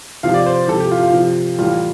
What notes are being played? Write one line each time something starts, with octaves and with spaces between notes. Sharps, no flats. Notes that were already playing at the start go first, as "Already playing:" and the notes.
C3 F3 F5
D5
C5
C3 F3 A4
G4
F4
F4
C3 F3
A2 E3 G3 F4